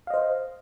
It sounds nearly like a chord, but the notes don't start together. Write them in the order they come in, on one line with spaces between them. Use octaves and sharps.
F5 D#5 C5